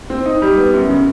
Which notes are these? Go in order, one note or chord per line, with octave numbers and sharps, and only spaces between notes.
C4
D#4
G3
B3
F#2
C#3